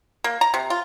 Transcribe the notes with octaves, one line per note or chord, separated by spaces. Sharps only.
A#3
A#5
C3
F4